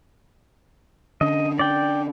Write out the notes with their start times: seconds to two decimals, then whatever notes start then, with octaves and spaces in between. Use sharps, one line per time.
1.21 D3 C#4 D4 D#5
1.59 D5 G5